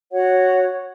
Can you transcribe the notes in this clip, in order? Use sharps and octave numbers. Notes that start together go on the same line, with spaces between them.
F#4 C#5 F#5